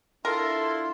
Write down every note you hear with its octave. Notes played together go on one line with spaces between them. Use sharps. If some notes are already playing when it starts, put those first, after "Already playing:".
D4 E4 F4 A4 A#4 C6